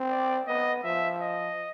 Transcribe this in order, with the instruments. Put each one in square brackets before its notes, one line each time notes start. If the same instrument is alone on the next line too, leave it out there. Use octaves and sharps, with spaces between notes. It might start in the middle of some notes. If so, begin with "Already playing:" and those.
Already playing: [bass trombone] C4
[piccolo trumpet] D5
[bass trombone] B3 [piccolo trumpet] D#5
[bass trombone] F3 [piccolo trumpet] E5
[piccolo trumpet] D#5